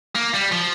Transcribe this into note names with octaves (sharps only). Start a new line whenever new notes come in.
A#3
G3
F3